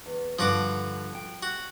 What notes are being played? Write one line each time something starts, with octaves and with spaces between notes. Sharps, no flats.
E2
G2 D3 F3 F#4 D6
G5
F#4